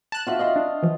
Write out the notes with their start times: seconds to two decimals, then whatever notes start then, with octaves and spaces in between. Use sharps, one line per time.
0.12 A5 F#6
0.27 F4 F#4 E5
0.39 D#5 F5 C6
0.56 D4
0.83 E3 F3